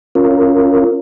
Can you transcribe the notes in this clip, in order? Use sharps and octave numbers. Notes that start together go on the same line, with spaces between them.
C#4 F4 A#4